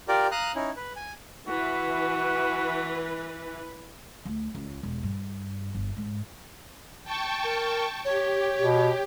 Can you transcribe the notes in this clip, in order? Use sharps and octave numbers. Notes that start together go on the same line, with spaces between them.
F4 G4 A#4 D5
F5 A#5 D#6 F#6
C#4 D#4 E4
B4
G#5
E3 F#4 B4
D2
C#2
E1
G2
G1
G#2
G5 A5 C#6
A#4
G4 C#5
B2